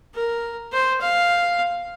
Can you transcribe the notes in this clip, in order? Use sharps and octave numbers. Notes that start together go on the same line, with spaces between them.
A#4
C5
F5